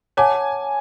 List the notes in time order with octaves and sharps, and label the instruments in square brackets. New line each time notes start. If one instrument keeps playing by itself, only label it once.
[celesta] C#5 F#5 A5 D6 [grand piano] G#5